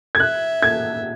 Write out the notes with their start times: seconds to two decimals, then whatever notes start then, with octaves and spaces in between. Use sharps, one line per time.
0.15 G#6
0.20 E5 F#6
0.62 G#6